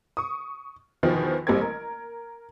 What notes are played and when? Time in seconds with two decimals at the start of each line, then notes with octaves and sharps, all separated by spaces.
0.17 C#6 D#6
1.03 E2 B2 D#3 F3
1.47 A1 G3 A#3 C4 G#6
1.61 A#4